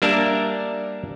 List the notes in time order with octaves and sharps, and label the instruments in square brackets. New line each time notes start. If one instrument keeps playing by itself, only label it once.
[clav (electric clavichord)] G3 A#3 D4 A#4 E5 A5